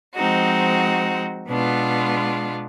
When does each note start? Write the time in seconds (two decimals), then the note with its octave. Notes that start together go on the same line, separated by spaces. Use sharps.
0.16 F3 G#3 C4 D#4 F#4
1.48 B2 G#3 B3 D4 F4